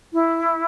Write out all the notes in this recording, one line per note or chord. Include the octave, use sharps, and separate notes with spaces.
E4